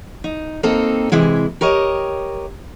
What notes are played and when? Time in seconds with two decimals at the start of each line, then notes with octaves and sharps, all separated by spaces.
0.24 D#4
0.63 A#3 C4 D#4 A4
1.12 C3 E3 G#3 E4
1.61 G4 A#4 C#5 D#5